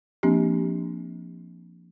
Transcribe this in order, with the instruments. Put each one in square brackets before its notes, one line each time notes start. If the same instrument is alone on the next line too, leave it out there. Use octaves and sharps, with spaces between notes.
[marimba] F3 A#3 C4 D4 G4